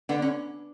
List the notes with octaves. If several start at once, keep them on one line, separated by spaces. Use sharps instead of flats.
D3 B3
C#4